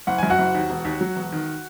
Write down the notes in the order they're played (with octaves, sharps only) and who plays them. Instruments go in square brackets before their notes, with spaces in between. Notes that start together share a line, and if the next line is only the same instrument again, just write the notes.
[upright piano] F#1 F#5
F#2 G#5
F#4 F#5
F#1
D#2
E1
D#2
F#3
E1
D#3